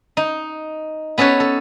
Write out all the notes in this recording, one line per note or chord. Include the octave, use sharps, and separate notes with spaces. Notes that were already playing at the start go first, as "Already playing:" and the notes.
D#4
B3 C#4 A4 B4 C#5
A4